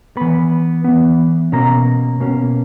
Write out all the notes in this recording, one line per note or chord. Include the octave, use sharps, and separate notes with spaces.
E3 B3 B5
E3 B3
B2 A#3 C#4 A#5
B2 A#3 C#4